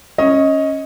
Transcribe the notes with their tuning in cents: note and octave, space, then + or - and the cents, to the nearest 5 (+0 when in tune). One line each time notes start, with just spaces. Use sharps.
C#4 -10 D#5 +15